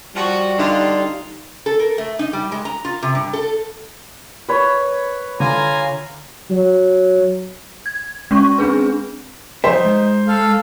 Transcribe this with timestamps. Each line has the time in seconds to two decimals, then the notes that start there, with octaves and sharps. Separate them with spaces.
0.16 F3 G3 F#4
0.59 D3 D#4 F4
1.66 A4
1.79 A#4
1.98 A3
2.19 D#4
2.33 G3
2.52 G#3
2.65 A#5
2.85 F4
3.03 C3
3.15 G2
3.33 A4
4.49 B4 C#5
5.40 D3 F4 G#5 A#5
6.49 F#3
7.86 G#6
8.31 G#3 C#4 C#6
8.58 C4 D4 G#4 B4
9.64 F3 D#4 C5 E5
9.85 G#3
10.28 A4 F5